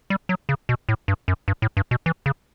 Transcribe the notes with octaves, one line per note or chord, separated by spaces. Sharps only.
G3
F#3
C#3
B2
A2
G2
F#2
G2
A2
G2
B2
E3
C#3